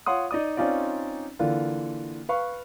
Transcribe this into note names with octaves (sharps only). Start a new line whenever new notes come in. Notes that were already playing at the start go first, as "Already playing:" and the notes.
F4 C#5 F#5 C6 D#6
D#4 D5 D#6
C4 C#4 D#4 F4 D5
D3 E3 A#3 F4
B4 F5 C#6